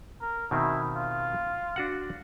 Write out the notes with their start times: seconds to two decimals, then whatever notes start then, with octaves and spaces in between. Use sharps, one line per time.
0.21 A#4
0.51 B2 D#3 C4 E4
0.96 F4
1.76 D4 F#4 F#5